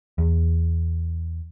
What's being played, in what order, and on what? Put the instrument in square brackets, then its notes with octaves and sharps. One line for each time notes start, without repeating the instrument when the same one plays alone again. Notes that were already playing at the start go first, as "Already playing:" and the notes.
[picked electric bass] E2